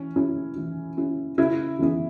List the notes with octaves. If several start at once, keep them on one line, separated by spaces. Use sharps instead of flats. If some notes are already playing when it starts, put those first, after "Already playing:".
Already playing: E3 C#4
C#4 E4
E3
C#4 E4
C#3 E4 E5
E3 B3 E4